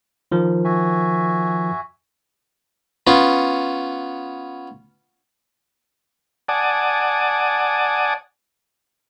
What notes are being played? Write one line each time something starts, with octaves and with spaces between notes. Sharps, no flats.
D#3 F3 A#4
F#4 E5 G#5
B3 C#4 F4
D5 F#5 G#5 A5 D6 D#6